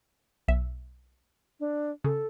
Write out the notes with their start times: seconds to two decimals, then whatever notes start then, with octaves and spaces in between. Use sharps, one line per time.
0.48 B1 E5
1.60 D4
2.04 C#3 A4